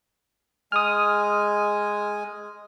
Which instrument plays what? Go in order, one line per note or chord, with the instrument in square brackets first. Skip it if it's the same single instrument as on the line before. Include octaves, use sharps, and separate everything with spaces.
[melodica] G#3 G#5 [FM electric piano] D#6 F6